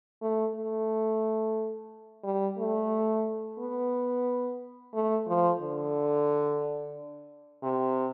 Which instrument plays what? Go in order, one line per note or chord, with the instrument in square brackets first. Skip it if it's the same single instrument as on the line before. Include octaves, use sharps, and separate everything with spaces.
[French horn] A3
A3
G3
A3
B3
A3
F3
D3
C3